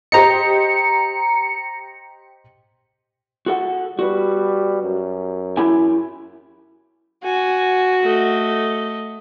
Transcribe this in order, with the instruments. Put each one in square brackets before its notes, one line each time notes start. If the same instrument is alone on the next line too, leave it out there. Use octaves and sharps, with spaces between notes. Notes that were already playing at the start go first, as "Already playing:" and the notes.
[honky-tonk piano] G4 C5 D#5 [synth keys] A#5 C#7
[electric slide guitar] F#4 A4 F#5
[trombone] G3 [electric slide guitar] F#4 B4
[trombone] F#2
[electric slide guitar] E4 G4 G#5
[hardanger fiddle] F#4 [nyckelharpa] G#5
[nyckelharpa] A3 D#5